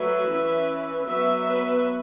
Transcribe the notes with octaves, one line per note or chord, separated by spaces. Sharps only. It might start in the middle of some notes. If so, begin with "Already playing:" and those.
Already playing: F#3 A3 B4 E5
E3 C#4
F#3 B3 B4 E5
B4 E5